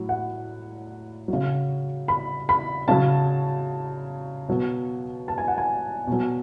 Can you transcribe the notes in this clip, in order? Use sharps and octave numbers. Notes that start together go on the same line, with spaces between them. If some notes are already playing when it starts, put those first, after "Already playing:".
Already playing: A2 F#3
F#5
F#3
C#3
B5
B5
C#3 F#3 A5
B2 F#3
A5
G#5
F#5
G#5
B2
F#3